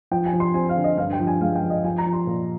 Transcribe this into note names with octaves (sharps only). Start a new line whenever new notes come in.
F3 G5
G#5
F3
C6
C4 G#5
F5
D3
D#5
G2 F5
G5
F3
G#5
G#3 F5
G5
F3
D#5
F3 G#5
A#5
F3
C6
A#2